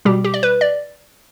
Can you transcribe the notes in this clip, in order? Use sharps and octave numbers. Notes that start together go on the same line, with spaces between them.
B2 G3 G4
G4
D5
B4
D5